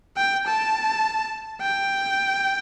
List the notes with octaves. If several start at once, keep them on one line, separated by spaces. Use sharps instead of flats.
G5
A5
G5